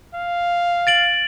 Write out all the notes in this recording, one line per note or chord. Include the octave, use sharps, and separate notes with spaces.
F5
A6 D7 F#7